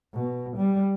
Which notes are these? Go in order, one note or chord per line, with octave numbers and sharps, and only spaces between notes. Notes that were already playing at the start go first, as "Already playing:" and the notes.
B2
G3